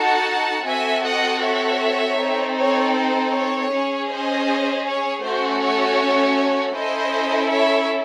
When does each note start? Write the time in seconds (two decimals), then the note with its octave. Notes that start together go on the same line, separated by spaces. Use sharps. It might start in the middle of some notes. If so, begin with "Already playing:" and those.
Already playing: D#4 F#4 A4 F#5 A5
0.66 C4 F#4 A4 E5 G#5
1.04 D#5 F#5
1.42 C#5 E5
2.18 C4 D#4 A4
2.57 C#5
2.94 C5
3.32 C#5
3.71 C#4 G#4
4.08 C5 D#5
4.84 C#5
5.22 A3 C#4 F#4 A4 C5
5.61 C#5
6.74 C#4 E4 A4 C5 D#5
7.50 C#5 E5